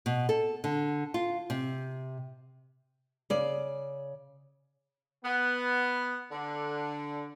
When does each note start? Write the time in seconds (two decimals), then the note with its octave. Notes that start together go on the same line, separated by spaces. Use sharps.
0.06 B2
0.29 A4
0.64 D3
1.14 F4
1.50 C3
3.30 C#3 D5
5.25 B3
6.32 D3